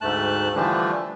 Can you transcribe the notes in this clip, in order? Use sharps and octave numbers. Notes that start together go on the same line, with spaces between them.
D2 G#2 A3 A5 F#6
D3 E3 F3 G3 A3 D4